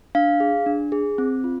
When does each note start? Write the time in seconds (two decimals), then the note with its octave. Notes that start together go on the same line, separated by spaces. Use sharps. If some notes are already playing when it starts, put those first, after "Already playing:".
0.15 D4 F5
0.40 G#4
0.66 D4
0.92 G#4
1.18 C4
1.44 F4